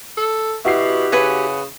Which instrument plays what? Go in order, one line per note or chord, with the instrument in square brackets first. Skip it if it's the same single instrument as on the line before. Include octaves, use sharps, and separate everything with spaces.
[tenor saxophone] A4
[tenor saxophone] B2 [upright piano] E4 F#4 C7 [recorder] G4
[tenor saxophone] C#3 [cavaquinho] B4 F#5 G#5